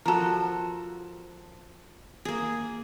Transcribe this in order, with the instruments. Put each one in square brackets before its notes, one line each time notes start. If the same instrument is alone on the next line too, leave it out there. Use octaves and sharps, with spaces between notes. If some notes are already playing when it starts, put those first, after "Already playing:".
[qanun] F3 F#4 [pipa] A4 A#4
[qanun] A#3 G#4